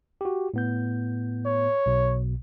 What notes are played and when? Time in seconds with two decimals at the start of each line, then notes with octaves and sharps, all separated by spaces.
0.21 F#4 G4
0.54 A2 B3 G6
1.46 C#5
1.86 B1 B2